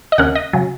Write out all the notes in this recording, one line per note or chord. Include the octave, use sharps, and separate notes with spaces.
D#5
D#2 C#3 A#3 F#5
D#5
C#3 F#3